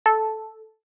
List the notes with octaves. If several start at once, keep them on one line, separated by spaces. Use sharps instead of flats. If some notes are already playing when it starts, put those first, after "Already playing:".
A4